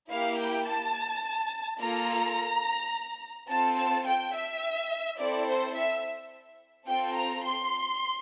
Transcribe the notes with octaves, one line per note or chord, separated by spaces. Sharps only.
A#3 E4 G4 F5
G5
A5
A#3 F4 A4 A#5
C4 F4 A4 A5
A5
G5
E5
C4 E4 A4 D5
C5
E5
C4 F4 A4 G5
A#5
C6